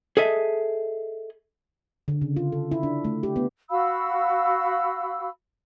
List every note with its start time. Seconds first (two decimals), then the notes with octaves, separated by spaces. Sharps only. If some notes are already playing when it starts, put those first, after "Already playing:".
0.17 G#4 A4 D#5 E5
2.08 D3
2.22 C#3
2.36 F4
2.52 A4
2.72 E4
2.83 D4
3.04 A3
3.23 G4
3.36 B3
3.70 F#4 F5 B5 E6